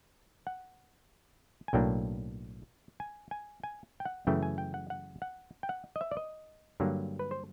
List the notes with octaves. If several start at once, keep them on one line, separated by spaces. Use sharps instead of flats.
F#5
G#5
B1 A2 F#3 A#3 D4 G5
G#5
G#5
G#5
G5
F#5
F#2 C#3 E3 A3 G5
G#5
G5
F#5
F#5
F#5
G5
F#5
D#5
E5
D5
D#5
G2 D3 F#3 A#3
B4
C5